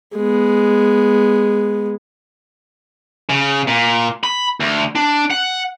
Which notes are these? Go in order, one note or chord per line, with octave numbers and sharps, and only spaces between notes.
G#3 B3
C#3
A#2
B5
D2
D4
F#5